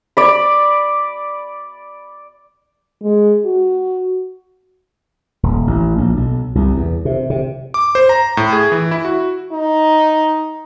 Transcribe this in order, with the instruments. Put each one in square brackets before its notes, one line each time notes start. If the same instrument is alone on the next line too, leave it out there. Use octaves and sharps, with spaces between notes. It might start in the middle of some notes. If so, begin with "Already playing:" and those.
[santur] D5 B5
[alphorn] G#3
F#4
[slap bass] D#1
A1
A#1
B1
C2
E2
C3
C3
[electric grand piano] D6
C5
A#5
A2
G#4
E3
E4
F#4
[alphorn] D#4